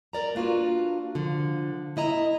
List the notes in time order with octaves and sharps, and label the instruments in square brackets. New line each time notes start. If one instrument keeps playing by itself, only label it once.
[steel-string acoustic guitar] A#4 D5 A#5
A#3 D4 F4 F#4 B4
D3 F3
F#2 E4 D#5 A#5